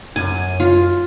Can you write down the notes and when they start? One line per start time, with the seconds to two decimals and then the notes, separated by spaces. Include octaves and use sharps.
0.16 F#2 G#5
0.60 F4